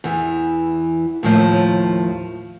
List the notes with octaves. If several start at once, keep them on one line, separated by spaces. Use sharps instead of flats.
E2 E3
D#2 A2 F3